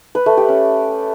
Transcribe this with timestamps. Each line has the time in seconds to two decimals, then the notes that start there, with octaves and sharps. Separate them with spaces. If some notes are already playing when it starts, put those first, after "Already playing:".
0.15 B4
0.26 A3
0.37 G4
0.49 C#4